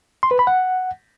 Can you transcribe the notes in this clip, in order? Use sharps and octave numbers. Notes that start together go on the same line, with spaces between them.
C6
B4
B5
F#5